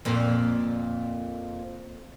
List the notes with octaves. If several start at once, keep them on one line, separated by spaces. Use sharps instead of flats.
F2 A#2